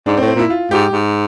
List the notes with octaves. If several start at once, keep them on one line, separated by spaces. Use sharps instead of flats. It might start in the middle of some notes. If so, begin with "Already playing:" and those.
G#2 D4
C4
A2
C4
A#2 E4
F4
G#2 G4
G#2